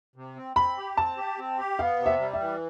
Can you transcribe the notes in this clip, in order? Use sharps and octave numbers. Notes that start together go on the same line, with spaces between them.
C3
C4
C4 B5
G4
C4 A5
G4
C4
G4
B3 F5
C3
E5
G3
E5
E3